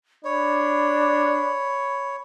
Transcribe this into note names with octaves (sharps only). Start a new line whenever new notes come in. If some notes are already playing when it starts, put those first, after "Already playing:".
D4 C#5 B5